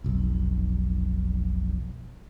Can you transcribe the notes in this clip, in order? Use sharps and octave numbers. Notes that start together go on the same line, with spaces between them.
F1 B1